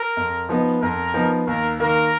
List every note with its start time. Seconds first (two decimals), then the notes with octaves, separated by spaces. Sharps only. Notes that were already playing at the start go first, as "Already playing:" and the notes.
Already playing: A#4
0.17 F2
0.49 F3 B3 D#4
0.82 F2 A#4
1.14 F3 B3 D#4
1.47 D#2 A#4
1.80 D#3 A#3 A#4